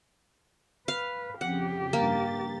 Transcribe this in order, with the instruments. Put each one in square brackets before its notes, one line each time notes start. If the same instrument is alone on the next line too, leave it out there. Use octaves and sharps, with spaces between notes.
[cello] B4 [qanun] F5
[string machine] F2 C#3 [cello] G4 [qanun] F#5
[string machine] G2 A6 [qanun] A#3